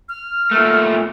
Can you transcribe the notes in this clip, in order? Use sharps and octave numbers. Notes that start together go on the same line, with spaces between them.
F6
A#2 A3